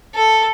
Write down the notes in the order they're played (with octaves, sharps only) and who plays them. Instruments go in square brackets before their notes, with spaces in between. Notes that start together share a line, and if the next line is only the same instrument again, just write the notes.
[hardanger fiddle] A4